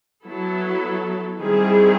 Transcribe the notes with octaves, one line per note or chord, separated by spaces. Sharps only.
F#3 B3 E4 A4
D#3 G3 C4 E4 G#4